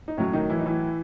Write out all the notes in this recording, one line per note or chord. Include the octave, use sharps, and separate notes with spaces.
D#4
A2 F#3 C#4
D#3 D#4
E3 E4
D#4
E3 E4